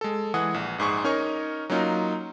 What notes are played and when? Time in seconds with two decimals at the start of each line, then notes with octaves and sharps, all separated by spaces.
0.01 G#3 A4
0.34 E3 G#3 G#4 F#5 D#6 F#6
0.54 A#1
0.78 A#1 G#2 G#4 C#6
1.04 C#4 D#4 A#4 C#5 C#6
1.70 F#3 A#3 C#4 D#4 F4